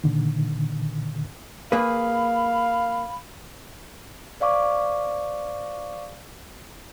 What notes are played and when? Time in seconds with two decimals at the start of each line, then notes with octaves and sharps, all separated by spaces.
0.04 A#2 D3 D#3
1.72 A#3 G#4 B4 F5 B5
4.40 C5 D5 F5 C#6 D6